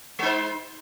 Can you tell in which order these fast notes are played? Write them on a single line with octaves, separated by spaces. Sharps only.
G#3 D#4 C5